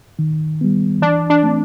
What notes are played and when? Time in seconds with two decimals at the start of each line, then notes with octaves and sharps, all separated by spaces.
0.19 D#3
0.61 G3 B3
1.02 E3 D4
1.30 D4
1.43 A3 C4